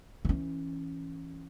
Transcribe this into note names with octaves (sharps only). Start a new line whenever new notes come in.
E3 C#4